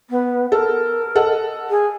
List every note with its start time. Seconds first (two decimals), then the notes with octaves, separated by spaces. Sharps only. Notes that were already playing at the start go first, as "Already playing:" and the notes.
0.10 B3
0.52 A4 A#4
1.15 A4 D#5 F#5
1.70 G#4